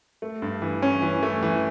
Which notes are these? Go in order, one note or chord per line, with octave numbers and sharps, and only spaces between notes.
A3
G2
E3
C#4
E3
A3
E3